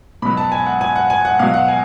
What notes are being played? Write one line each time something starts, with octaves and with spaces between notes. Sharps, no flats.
B2 F#3 B5
A5
G#5
F#5
G#5
F#5
G#5
F#5
B2 F#3 F5
F#5
G#5